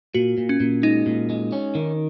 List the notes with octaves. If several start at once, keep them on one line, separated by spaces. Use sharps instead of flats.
A#2 F#4
A#2
C#4
A#2
G#3 D#4
A#2
G#3
C#4
D#3